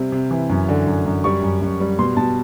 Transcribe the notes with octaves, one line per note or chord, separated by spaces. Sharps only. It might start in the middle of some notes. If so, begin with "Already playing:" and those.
Already playing: C3 G3 C4
C3
E3
F#2
D3
F#2
F#2
G3 C#6
F#2
F#2
G3
B2 C6
B2 A5